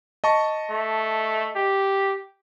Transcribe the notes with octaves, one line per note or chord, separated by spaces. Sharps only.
D#5 A5 C#6
A3
G4